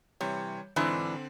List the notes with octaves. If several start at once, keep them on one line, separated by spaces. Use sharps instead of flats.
C3 E3 G3 C#5
G#2 D3 E3 C4 D4